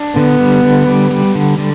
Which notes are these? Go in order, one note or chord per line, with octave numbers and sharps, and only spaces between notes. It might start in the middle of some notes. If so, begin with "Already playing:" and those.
Already playing: D4
D3 B3
G3
D3
G3
G3
D3
D3